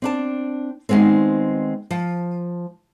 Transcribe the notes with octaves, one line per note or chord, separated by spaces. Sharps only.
C4 D4 A5
D#3 G3 G#3 B3 C4
F3